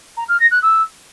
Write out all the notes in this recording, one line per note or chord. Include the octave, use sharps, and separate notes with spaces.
A#5
F6
A#6
F#6
E6